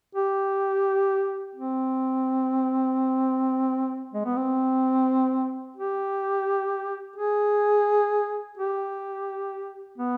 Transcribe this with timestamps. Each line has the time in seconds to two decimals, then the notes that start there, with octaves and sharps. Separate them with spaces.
0.15 G4
1.55 C4
4.14 G#3
4.25 B3
4.36 C4
5.77 G4
7.16 G#4
8.58 G4
9.98 B3